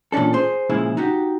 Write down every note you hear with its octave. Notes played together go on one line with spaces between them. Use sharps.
A#2 E3 C#4 D4 A4
G#4 C5
A#2 C#3 F3 G#3 E4
D#4 F#4 G4